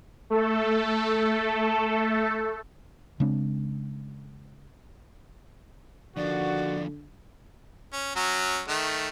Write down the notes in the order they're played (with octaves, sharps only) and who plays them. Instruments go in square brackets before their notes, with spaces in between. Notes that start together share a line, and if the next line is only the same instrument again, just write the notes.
[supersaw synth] A3 A4
[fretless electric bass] C#3 G#3 C4 D4
[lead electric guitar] D#2 F3 [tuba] D3 [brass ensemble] D#3 F#4 [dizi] D5
[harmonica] C#4
F#3 C#4
D#3 A3